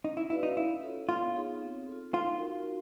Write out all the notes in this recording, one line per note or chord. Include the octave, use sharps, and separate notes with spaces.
C#4 D#4
E4
E4 F#4 B4 D5 F5
D#4
C#4 E4
F4 A4 C#5
B3 F4
D#4 G#4 C#5
C4
F4 A4
D#4 F4
F#4 A#4